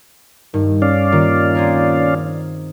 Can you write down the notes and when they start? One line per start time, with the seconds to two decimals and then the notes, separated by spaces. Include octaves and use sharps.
0.54 G2 D#3
0.82 C#4 D5 F5
1.12 A#2 D#3
1.55 C4 G#4 A#4